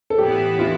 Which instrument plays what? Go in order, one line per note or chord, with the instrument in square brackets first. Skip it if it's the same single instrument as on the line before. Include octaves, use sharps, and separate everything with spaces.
[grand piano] A4
[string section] A2 E3 B3 E4 [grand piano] G4
[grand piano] F4